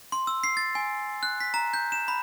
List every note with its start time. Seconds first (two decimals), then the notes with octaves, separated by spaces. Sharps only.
0.12 C6
0.27 E6
0.44 C7
0.57 A6
0.75 G#5
1.23 F#6
1.40 B6
1.54 A#5
1.74 G6
1.92 E7
2.08 B5